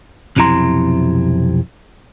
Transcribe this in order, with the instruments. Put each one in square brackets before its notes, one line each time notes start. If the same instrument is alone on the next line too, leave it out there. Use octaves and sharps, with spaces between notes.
[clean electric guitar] B1 F2 C3 E4 A#5 C6